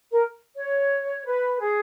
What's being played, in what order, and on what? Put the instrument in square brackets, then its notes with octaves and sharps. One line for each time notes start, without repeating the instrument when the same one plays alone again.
[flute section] A#4
C#5
B4
G#4